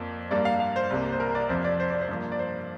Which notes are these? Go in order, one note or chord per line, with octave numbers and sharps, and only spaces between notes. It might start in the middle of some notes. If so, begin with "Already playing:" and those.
Already playing: F2 F3 A#3 D5
G2 G3 A#3 D5
F5
F5
C5
C2 C3 G3 A#3
C5
A#4
D5
F2 C3 F3 C5
D5
C5
D5
C5
G2 F3 A#3
D5
C5